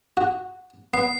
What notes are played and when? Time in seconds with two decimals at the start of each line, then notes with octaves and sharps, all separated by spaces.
0.17 F#4
0.94 B3 C7